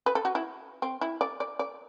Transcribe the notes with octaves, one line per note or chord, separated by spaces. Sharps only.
B4
A4
F#4
E4
C4
E4
D5
D5
D5